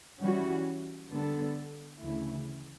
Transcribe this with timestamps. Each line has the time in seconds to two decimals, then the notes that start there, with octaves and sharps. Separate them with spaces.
0.21 E3 G3 C#4 F#4
1.11 D3 G3 B3 D4 A4
2.01 D2 C#3 E3 A3 E4